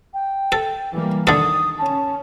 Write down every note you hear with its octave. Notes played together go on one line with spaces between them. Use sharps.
G5
A4
E3 G3 A#3
D3 D#3 A4 D#6
C#4 A5